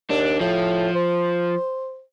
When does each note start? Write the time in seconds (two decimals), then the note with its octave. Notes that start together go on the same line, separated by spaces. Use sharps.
0.10 D#2 D4
0.40 A2 F3
0.95 C5